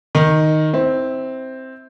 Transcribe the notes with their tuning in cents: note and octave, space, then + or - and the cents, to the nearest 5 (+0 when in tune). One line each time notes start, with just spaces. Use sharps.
D#3 +0 D#4 +0
C4 +0 E4 -30